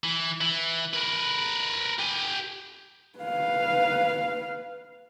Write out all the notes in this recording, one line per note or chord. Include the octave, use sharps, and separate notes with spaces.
E3
E3
A#4 B4
G4 G#5
B4 F5